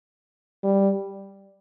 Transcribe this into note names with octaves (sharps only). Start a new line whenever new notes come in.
G3